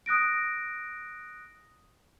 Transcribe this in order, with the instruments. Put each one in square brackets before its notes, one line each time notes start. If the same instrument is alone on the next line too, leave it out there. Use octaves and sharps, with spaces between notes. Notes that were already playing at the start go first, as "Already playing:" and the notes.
[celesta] D#6 F#6 A#6 D7